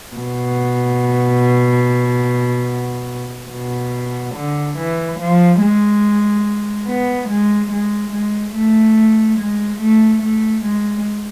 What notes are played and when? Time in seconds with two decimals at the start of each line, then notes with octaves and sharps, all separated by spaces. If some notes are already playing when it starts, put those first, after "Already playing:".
0.16 B2
3.51 B2
4.36 D3
4.78 E3
5.20 F3
5.61 G#3
6.87 B3
7.29 G#3
7.72 G#3
8.13 G#3
8.55 A3
9.39 G#3
9.81 A3
10.23 A3
10.65 G#3